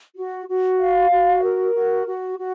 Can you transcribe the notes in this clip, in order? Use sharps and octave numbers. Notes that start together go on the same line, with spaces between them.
F#4
F#4
F5
F#4
A#4
F#4
F#4
F#4